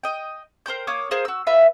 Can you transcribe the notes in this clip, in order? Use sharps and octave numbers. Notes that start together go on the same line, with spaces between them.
D#5 G5
A#4 C5 G5 G6
A#3 C#5 D6 D#6
G#4 A#4 C5 F5
F#4 E6
F4 B4 E5 F5